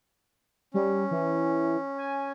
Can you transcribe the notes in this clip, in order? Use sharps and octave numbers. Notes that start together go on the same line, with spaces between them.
G3 C#4
E3
G#5